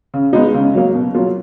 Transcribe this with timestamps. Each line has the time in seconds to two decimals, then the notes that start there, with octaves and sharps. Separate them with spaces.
0.14 C#3
0.33 G#3 B3 D#4
0.54 C#3
0.74 F#3 A#3
0.95 B2
1.14 F#3 A#3 F4